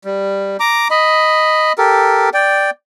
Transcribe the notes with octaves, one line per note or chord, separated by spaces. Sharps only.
G3
A#5 D6
D#5 B5
G4 A4 A#4
D5 G5